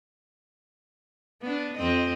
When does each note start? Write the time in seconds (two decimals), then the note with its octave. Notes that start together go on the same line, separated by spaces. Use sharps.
1.42 B3 D4
1.77 F2 C4 D#5